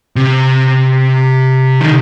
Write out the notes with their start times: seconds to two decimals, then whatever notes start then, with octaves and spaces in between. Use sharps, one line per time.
0.16 C3
1.81 D#3